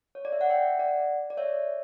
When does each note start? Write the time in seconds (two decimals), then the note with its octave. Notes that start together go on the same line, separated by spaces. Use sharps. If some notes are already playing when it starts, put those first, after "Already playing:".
0.15 C#5
0.25 D5
0.32 E5
0.41 F#5
0.50 E5 G5
0.79 D5 F#5
1.30 D5
1.37 C#5 E5